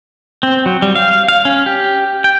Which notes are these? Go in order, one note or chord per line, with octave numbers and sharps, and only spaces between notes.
C4
F#3
G3
F5
F5
C#4
G4
G5